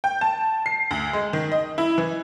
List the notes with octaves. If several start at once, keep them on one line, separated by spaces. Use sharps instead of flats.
G5
A5
C7
D2
G#3
D#3
D#5
E4
E3